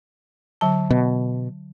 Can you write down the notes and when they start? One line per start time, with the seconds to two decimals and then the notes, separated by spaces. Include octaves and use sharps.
0.61 D3 F#3 A5
0.91 B2